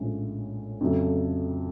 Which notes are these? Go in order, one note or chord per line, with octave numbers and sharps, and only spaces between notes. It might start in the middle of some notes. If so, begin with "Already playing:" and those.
Already playing: A#1 A2 F3 G#3 C#4
F2 C#3 F#3 A3